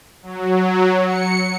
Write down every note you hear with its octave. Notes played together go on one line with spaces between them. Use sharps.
F#3
C#7